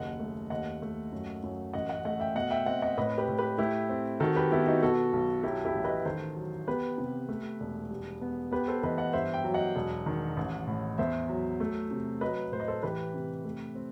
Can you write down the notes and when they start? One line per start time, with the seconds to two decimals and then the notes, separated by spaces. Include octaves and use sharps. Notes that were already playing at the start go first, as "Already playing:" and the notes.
Already playing: F#1 D#2 D#5 F#5
0.19 A3
0.50 D#2 D#5 F#5
0.82 A3
1.12 F#2
1.43 F#2
1.73 A1 D#5 F#5
1.89 D#5 F#5
2.05 A3 D#5 F#5
2.20 E5 G5
2.35 B2 D#5 F#5
2.50 E5 G5
2.66 C4 D#5 F#5
2.82 D#5 F#5
2.98 A2 B4 D#5
3.18 G4 B4
3.28 A2
3.39 G4 B4
3.58 A3 E4 G4
3.89 C4
4.20 D#3 F#4 A4
4.36 G4 B4
4.51 B3 E4 G4
4.66 D#4 F#4
4.82 B2 F#4 A4
5.13 B1
5.43 F#3 E4 G4
5.65 E4 G4
5.74 A1
5.84 B4 D#5
6.05 D#3 A4 C5
6.36 F#3
6.67 B3 G4 B4
6.98 C3
7.29 A3
7.60 E1
7.91 G3
8.21 B3
8.51 B3 G4 B4
8.68 A4 C5
8.83 E3 B4 D#5
8.98 D#5 F#5
9.13 G2 C5 E5
9.34 E5 G5
9.44 F#3
9.54 D#5 F#5
9.75 E1
10.06 D#3
10.37 A1
10.67 A2
10.98 E2 C5 E5
11.29 F#3
11.60 A3
11.91 C3
12.21 F#3 B4 D#5
12.52 A2 C5
12.60 D#5
12.68 A4 C5
12.83 E3 G4 B4
13.14 C3
13.45 A3
13.75 C4